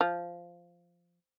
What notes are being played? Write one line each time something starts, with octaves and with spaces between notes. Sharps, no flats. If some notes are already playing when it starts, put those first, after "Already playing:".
F3